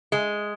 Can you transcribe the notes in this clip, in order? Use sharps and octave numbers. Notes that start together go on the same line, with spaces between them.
G#3